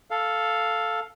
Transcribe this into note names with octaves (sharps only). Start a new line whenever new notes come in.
A4 F5